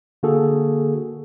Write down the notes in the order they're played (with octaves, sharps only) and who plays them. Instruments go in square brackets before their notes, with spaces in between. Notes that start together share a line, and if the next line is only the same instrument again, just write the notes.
[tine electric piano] D3 A#3 F#4 G#4 A4